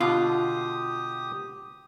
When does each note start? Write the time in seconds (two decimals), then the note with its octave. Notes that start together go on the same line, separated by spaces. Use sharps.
0.01 B2 D3 F4 G4 D#6